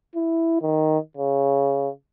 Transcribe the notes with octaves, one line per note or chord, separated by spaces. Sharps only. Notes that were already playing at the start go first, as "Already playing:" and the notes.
E4
D#3
C#3